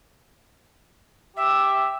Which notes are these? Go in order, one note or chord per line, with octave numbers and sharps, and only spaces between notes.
G4 E5